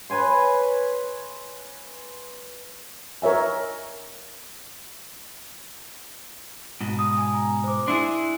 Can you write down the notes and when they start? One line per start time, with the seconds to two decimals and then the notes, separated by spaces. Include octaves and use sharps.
0.10 B4 C#5 G#5 C6
3.22 A#4 C#5 E5 G#5
6.81 G#2 B2
6.99 D#6
7.18 G#5
7.35 A#5
7.64 C5 D6
7.88 D4 E4 G#4 C6